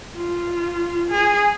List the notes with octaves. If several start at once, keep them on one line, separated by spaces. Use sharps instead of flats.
F4
G#4